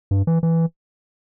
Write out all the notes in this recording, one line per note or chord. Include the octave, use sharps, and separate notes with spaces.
G2
E3
E3